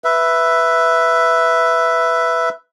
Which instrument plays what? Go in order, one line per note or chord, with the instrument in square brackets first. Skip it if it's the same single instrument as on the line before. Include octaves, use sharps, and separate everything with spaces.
[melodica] B4 E5